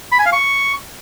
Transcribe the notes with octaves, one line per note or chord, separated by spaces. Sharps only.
B5
G#5
F5
C#6